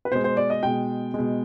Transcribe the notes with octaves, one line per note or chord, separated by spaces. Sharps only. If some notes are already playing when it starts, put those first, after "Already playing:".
B4
B2 G#3 C5
C5
D5
D#5
B2 G#3 G5
B2 G#3